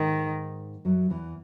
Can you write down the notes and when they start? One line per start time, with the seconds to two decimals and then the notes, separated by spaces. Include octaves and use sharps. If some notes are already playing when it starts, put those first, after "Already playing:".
Already playing: G#2 D#3 G#3
0.85 F#2 F#3
1.10 E2 E3